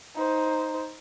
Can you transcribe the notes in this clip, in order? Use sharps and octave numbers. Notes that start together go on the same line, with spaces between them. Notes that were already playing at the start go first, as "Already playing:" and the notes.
D#4 C5